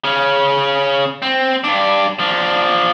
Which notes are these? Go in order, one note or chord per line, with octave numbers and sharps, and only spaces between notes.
C#3 C#4
C4
G2 D4
F3 D4